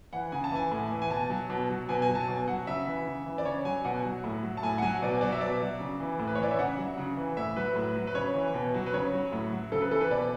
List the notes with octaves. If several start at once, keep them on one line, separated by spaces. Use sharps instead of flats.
E3 F#5
C#3 G#5
A5
E3 G#5
A2
E3
G#5
B2 A5
F#3
B2
F#3
B2 G#5
G#5
F#3
A5
B2
F#3 F#5
C#3 E5
E3
C#3
E3
D5
C#3 C#5
F#3 G#5
B2 F#5
F#3
A2
F#3
A5
A2 G#5
F#5
F#3 G#5
B2 D5
F#3 D5
E5
B2 D5
F#3
C#3
E3
A2
B4
C#5
E3 D5
E5
C#3 F#5
F#3
C#3
E3
A2 E5
F#3 B4
A2
F#3
B4
C#3 C#5
E3
B2
F#3
B4
C#3 C#5
F#3
A2
F#3
C#3 A4
B4
E3 A4
B4
B2 D5